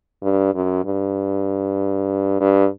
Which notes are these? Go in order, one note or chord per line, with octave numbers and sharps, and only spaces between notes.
G2
F#2
G2
G2